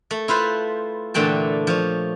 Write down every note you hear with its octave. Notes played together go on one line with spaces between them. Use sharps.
A3
E4 F4 B4 C5
A#2 D3 E3 A3 G5 A5
F3 C#5